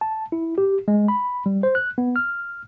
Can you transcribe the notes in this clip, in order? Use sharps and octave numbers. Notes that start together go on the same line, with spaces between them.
A5
E4
G4
G#3
B5
G3
C5
F#6
B3
F6